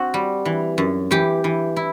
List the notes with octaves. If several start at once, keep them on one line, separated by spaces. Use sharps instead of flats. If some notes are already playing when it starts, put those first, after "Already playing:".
Already playing: C4 F#4
G3
E3
F#2
E3 G4
E3
E4